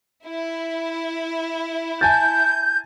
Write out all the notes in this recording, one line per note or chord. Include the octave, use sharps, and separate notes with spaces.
E4
G#5 A5 G6 A6